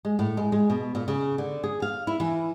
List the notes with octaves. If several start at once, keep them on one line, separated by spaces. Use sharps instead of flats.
G#3
A2
G#3
G#3
B2
A#2
C#3
D3
G#4
F5
E4
E3